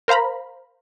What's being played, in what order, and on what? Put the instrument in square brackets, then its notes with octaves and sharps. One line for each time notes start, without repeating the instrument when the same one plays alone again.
[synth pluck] A#4 C5 F5 A#5 B5